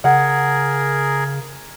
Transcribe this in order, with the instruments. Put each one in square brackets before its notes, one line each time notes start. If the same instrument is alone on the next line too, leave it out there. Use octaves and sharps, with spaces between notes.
[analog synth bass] C#3 [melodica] G#4 A#4 [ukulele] F#5